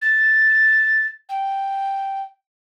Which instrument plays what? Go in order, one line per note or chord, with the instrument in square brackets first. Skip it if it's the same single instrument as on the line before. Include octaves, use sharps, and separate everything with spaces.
[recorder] A6
G5